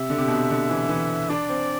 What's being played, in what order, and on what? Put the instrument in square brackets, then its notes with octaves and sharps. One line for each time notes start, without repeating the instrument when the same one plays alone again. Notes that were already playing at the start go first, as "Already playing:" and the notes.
Already playing: [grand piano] C3 [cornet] E5
[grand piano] D3
C3
B2
C3
D3
E3
E3
[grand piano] D4 [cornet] D5
[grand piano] C4